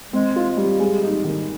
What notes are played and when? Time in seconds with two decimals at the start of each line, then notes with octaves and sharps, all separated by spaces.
0.13 G#3 C4
0.36 F4
0.57 G3
0.80 G#3
1.03 D#4
1.24 D#3